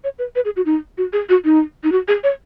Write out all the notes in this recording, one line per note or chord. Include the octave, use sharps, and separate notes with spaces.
C#5
B4
B4
G#4
F#4
D#4
F#4
G#4
F#4
D#4
D#4
F#4
G#4
C#5